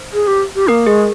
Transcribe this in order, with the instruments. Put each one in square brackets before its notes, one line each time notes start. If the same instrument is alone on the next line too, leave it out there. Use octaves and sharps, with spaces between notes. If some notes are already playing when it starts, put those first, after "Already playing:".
Already playing: [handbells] C5
[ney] G#4
G4
G4
[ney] A#3 [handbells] A#4
[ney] G#3 [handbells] G#4